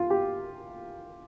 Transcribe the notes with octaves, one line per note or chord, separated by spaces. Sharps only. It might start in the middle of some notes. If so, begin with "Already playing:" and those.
Already playing: F4
G4